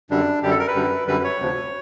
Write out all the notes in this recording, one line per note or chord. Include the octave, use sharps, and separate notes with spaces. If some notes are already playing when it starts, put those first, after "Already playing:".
F#2 D3 G3 D4
F#2 D3 G3 G4
A4
A#4
B4
F#2 D3 G3
F#2 D3 G3 B4
C#5
D2 C3 F3